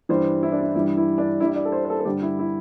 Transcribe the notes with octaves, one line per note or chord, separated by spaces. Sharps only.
G2 E3 G3 C5
E4
D4
E4
G2 E3 G3 E4
E4
D4
G2 G3 E4 E5
D5
A4
C5
C5
A4
A4
G2 D3 G3 G4
E4
E4